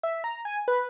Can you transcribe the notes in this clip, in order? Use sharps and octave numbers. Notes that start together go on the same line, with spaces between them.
E5
A#5
G#5
B4